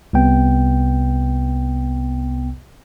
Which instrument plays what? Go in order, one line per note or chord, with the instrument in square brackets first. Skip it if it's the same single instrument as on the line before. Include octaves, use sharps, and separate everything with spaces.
[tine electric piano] C2 C3 B3 G5